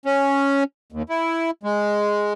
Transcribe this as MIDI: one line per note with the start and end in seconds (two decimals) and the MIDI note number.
0.06 0.64 61
0.92 1.03 39
1.09 1.51 64
1.63 2.33 56